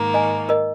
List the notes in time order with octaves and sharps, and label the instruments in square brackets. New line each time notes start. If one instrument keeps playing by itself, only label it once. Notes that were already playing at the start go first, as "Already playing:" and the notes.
Already playing: [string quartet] G#2 D#3 A#3
[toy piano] D#5 G#5
A#4 D#5